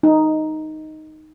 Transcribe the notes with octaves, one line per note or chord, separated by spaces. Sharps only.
D#4